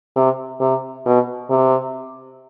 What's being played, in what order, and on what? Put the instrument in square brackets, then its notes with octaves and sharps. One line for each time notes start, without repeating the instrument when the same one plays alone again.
[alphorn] C3
C3
B2
C3